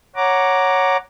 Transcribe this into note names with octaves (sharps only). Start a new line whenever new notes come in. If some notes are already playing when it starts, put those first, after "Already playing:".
C#5 F#5 A#5 D6